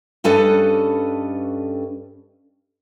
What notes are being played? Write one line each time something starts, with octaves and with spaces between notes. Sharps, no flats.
G2 G3 C#4 A4 B4 D#5